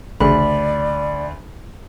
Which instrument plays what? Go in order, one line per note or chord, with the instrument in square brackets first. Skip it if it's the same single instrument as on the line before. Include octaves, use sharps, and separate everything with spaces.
[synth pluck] A1 C#3 [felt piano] D2 [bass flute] D5 [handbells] B5